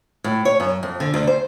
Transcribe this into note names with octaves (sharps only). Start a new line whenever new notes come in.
A2
C#5
F#2
F2
D3
D2
C5